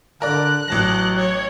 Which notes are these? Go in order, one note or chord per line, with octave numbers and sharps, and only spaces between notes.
D3 A#4 D5 F#6
A1 F#3 A5 A#6
C#5